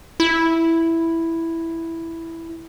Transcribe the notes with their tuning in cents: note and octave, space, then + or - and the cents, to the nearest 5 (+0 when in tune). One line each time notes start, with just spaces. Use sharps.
E4 +0